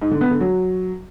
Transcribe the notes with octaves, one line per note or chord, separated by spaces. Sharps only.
G#2
D3
B3
D3
F#3